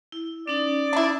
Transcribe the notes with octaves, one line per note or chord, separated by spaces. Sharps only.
E4
C#4 D#4 D5
D4 E4